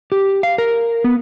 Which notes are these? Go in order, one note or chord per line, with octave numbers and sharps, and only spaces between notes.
G4
F5
A#4
B3